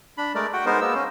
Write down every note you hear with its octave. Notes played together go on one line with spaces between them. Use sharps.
D4 B5
G#3 A3 A#4 D5
F#4 F#5 G5
G#3 B3 D#4 A#4 C5
G#3 A#3 B3 E6
C#4